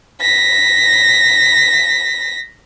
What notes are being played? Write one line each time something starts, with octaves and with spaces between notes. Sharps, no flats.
A#6 B6